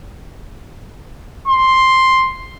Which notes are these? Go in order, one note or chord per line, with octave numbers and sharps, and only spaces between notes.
C6